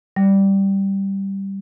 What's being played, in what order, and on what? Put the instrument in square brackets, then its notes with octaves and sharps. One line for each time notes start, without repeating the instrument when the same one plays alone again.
[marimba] G3